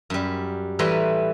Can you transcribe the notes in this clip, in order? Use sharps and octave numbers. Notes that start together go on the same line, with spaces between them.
F#2 G3
A2 E3 G3 B4 A#5 C6